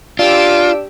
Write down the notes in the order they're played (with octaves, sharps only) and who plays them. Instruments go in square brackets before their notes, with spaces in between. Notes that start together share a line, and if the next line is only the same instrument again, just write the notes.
[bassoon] D4 [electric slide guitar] F4 [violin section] G4 E6 D7